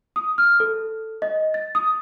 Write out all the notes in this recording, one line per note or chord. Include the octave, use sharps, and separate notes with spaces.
D#6
F6
A4
D#5
A6
D#6